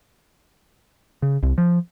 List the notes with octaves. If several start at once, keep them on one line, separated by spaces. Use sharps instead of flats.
C#3
C2
F3